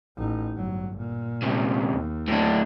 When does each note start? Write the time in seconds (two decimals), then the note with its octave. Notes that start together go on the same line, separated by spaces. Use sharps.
0.18 A1 D#4
0.55 G1 F#3
0.98 A#2
1.43 D2 C3
1.93 D#2
2.28 A2 D4